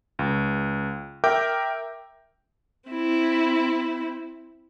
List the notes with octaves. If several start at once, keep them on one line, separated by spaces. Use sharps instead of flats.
C#2
A#4 E5 G5 D6 G6
C4 E4